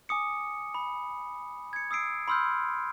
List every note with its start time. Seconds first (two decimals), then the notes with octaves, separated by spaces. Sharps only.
0.09 G#5 D6 D#6 C#7
0.75 B5
1.73 G#6 C#7
1.91 D#6 E6 C7 D7
2.28 B5 C6 E6 F6 G6